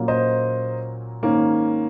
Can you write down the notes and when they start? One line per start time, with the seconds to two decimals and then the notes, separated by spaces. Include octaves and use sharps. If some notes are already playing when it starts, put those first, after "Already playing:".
Already playing: A#2 F#3 A#3 C#4
0.08 C5 D#5
1.23 G#2 D#3 A#3 C#4